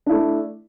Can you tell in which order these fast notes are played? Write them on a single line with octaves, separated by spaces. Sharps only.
D4 E4 A3